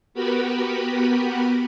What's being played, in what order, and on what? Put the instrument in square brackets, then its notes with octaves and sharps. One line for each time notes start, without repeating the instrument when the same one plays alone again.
[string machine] B3 F#4 G4 A#4 B4 B5